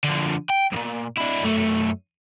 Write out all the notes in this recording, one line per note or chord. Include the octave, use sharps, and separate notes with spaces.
D3 F3
G5
B1 A#2
D4 E4
F#2 A3